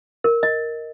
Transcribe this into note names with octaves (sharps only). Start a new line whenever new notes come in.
A#4
D#5